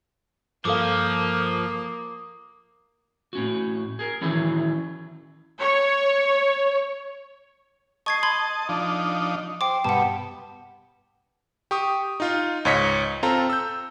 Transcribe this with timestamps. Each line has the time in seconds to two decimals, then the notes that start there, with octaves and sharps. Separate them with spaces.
0.65 G2 F3 A#3 A4 F5 D6 D#6
3.33 A2 C#4 F#4
3.99 G#4 A#4
4.21 D#3 E3 F#3 C#4 E4 G#4
5.59 C#5
8.06 D#5 A5 C#6 G#6 C7
8.23 B5 C6 G#6
8.69 F3 D4 D#4
9.61 C5 G5 D6
9.84 G2 B2 F#5 A5
11.71 G4 C#6 D#6
12.20 D#4 F4
12.65 C#2 G#2 C#5 D#5 B6 C#7
13.23 C4 F4 A4 A#5
13.50 E6 G6